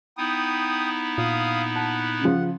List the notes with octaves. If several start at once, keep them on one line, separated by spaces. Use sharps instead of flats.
B3 D#4 E4 G5 D#6
A#2 F5 D#6
F#5 A5
C#3 F3